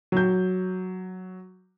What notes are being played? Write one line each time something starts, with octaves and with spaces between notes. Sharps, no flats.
F#3 G6